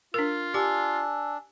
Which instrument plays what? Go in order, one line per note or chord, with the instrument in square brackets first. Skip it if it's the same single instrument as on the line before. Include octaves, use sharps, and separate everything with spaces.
[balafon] D4 A#4 [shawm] F4
[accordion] D4 [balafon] G4 [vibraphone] G#5 E6